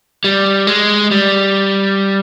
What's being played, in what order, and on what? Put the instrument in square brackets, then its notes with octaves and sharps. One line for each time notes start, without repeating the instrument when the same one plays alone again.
[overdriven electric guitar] G3
G#3
G3